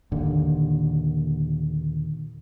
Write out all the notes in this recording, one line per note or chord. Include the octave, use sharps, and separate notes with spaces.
D#2 A#2 D3